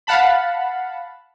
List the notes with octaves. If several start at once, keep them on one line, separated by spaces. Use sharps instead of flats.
F5 F#5 A5 B5